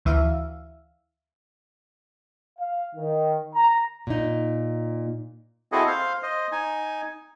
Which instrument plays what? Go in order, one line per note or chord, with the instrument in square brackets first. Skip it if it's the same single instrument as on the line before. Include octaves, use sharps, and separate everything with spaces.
[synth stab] D2 E3 E5 F5
[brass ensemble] F5
D#3
A#5
[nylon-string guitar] A#2 D#4
[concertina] C4 E4 F#4 G#4 A4 D#5
C5 F5
C5 D#5
D#4 G#5